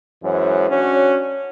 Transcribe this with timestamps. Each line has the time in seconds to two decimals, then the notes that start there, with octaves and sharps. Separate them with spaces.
0.23 F#2 E3 G#3 C5 C#5 F#5
0.69 C#4 D4 F#4 C#5